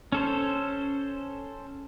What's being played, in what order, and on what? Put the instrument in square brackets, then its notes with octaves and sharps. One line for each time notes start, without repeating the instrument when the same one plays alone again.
[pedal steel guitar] C#4 A4 C5